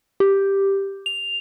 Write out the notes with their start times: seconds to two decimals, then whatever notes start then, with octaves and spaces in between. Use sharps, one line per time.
0.20 G4
1.06 F7